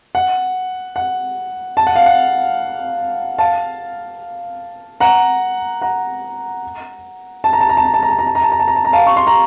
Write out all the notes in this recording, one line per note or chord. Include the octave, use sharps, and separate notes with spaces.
F#5
F#5
A5
F#5
F5
F#5
F5 A5
F#5 A#5
F#5 A#5
A5
A#5
A5
A#5
A5
A#5
A5
A#5
A5
A#5
A5
A#5
A5
A#5
A5
A#5
A5
A#5
F5 A5
C#6
C6
A#5